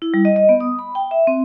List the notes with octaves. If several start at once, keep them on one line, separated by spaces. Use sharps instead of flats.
E4
G3
D#5
D#5
B3
D#6
B5
G5
E5
C4